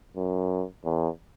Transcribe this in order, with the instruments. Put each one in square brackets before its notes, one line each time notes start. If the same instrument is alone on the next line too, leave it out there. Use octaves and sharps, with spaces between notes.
[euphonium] F#2
E2